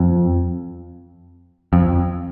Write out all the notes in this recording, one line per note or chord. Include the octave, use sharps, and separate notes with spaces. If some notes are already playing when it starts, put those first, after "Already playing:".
Already playing: F2
F2